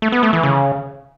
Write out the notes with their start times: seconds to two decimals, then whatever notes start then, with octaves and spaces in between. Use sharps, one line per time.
0.02 A3
0.12 B3
0.23 A3
0.33 E3
0.43 C#3